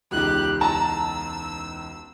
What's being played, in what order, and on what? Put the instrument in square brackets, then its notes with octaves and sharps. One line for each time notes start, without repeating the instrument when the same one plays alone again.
[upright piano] E1 C#2 D#4 [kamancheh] G4 F#6
[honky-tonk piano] A5 A#5 [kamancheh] E6